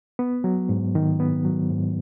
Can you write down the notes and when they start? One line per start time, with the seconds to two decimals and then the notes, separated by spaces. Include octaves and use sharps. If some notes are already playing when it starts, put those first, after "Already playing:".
0.19 B3
0.44 F#3
0.69 G#2
0.95 D#3
1.20 B3
1.45 F#3
1.70 G#2